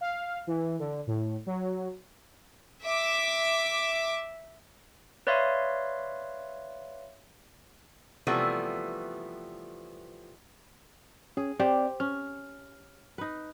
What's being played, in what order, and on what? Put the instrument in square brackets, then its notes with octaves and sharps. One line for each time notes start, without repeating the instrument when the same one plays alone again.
[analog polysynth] F5
E3
D3
A2
F#3
[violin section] E5 D6
[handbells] B4 C#5 D5 E5 F5 C6
[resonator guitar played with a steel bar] C3 E3 F3 G3 A3 B3
[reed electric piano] C#4 [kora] G#4
[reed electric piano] C4 D5 [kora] G4 C5
[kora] C#4 [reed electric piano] F6
[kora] D#4 B4